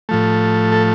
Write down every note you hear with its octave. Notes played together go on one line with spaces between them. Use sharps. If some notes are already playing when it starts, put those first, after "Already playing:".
A2 F3 A3
A4